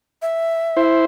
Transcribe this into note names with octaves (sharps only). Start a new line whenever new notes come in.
E5
E4 C5